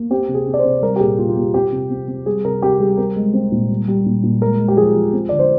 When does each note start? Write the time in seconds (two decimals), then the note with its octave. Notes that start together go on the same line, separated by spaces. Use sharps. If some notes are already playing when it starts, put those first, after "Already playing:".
Already playing: A#3
0.10 C4 G4
0.28 C3
0.34 G#4
0.47 C3
0.54 D5
0.59 C5
0.64 C3
0.82 G3 A#4
0.96 G4
1.00 A#2 G#4
1.18 A#2 F4
1.29 F4
1.36 A#3 G4
1.54 C4 G4
1.72 C3
1.90 C4
2.08 C4
2.26 G3 G#4
2.45 C3 A#4
2.62 C3 G4
2.80 G3 G#4
2.98 C4 A#4
3.16 G#3
3.33 C4
3.52 A#2
3.69 G3
3.88 G3
4.06 A#2
4.23 A#2
4.41 G#3 A#4
4.59 G#3
4.68 G4
4.77 F3 G#4
4.95 F3
5.13 C4
5.29 D3 D5
5.39 C5